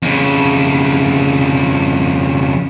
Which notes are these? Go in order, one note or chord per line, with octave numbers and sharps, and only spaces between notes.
F2 C#3